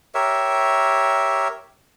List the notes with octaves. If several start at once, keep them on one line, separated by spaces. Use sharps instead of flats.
G4 A#4 C#5 E5